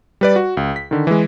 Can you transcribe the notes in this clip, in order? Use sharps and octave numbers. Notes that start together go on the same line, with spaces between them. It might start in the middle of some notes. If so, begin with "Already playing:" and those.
G3 B4 D5
F#4
C#2
B6
D3 D#3
E3 G#3